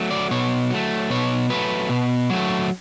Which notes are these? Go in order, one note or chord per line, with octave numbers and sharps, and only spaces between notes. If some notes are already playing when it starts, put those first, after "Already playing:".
Already playing: F#3 A3
D5
B2 C#5
F#3 A3
B2 C#5
F#3 A3 B4
B2
F#3 A3